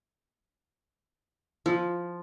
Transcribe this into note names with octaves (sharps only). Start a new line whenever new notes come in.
F3